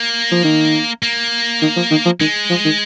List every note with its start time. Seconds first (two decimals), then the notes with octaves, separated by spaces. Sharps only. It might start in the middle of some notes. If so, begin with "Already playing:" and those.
Already playing: A#3
0.31 F3
0.44 D#3
1.03 A#3
1.62 D#3
1.76 F3
1.91 D#3
2.05 F3
2.20 D#3 G#3
2.50 F3
2.65 D#3